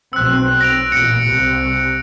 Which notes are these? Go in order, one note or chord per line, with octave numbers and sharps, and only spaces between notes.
B1 C4 E6 F#6
A#6 D7 F7
A1 A#2 A#6 C#7 D7
C2 C3